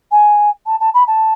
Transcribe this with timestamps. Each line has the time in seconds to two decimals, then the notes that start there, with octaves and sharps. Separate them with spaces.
0.11 G#5
0.66 A5
0.80 A5
0.94 B5
1.07 A5